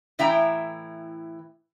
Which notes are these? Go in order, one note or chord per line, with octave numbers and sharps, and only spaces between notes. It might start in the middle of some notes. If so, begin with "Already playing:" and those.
A2 E3 E5 G5 A#5